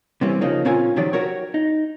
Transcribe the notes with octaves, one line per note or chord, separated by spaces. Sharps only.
C3 E3 G3 A#3 C4 C#4
C#3 F3 A#3 D#4
A#2 C4 C#4 F4 A#4 G#5
C3 D#3 F3 F#3 G4 D5
F#4 G4 A#4 C#5
D#4